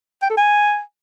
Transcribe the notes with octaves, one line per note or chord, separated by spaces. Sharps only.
G5
A4
G#5